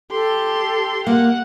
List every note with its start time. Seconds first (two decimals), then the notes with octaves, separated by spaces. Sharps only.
0.11 G4 A4 C6
1.07 A#3 F#5